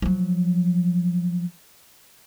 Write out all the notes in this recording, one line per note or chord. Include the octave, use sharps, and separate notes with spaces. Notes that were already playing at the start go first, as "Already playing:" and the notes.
F3 F#3